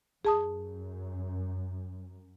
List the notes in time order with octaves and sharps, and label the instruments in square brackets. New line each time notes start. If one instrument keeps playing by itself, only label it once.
[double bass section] F#2 [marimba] G#4 A5 D#6